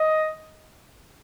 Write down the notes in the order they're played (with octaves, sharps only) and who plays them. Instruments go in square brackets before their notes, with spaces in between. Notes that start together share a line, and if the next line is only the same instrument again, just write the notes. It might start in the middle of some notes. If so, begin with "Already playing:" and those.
Already playing: [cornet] D#5